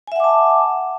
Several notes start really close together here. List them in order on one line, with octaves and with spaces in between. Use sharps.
G#5 E5 F#5 D6 A5